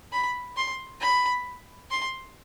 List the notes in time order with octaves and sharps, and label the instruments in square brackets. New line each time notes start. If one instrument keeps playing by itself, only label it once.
[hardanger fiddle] B5
C6
B5
C6